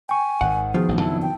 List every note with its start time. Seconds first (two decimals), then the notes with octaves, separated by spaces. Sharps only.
0.09 G5 G#5 C#6
0.41 G#1 D#3 F#5
0.74 B2 D#3 F3 F4 G#4
0.89 A1
1.00 F2 C#3 F#3 E4 A5
1.22 G5